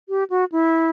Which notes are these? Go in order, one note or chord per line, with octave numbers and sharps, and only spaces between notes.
G4
F#4
E4